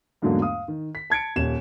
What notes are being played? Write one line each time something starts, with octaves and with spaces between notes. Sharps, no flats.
E2 G#2 D3 F#3 A3 A#3
F5 D#6
D#3
B6
A5 G#6 C#7 D7
D#1 E7